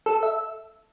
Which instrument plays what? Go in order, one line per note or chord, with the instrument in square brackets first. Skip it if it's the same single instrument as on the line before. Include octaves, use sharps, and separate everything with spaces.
[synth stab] A4
E5